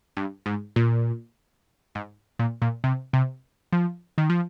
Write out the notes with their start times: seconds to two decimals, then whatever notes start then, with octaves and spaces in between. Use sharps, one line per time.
0.17 G2
0.46 G#2
0.76 A#2
1.95 G#2
2.39 A#2
2.62 A#2
2.84 C3
3.13 C3
3.73 F3
4.18 D#3
4.30 F3